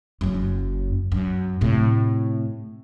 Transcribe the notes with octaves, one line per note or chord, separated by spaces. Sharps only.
F#1 F#2
F#2
A2 C3